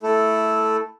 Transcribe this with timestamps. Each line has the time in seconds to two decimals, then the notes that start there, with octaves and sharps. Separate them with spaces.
0.03 A3 E4 A4